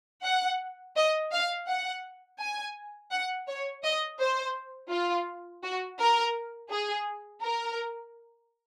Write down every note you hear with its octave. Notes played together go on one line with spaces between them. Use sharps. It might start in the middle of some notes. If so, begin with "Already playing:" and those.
F#5
D#5
F5
F#5
G#5
F#5
C#5
D#5
C5
F4
F#4
A#4
G#4
A#4